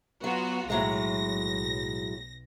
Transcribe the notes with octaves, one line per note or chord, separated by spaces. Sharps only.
F#3 B3 F4 F#4
B1 A2 F#3 G#3 A#6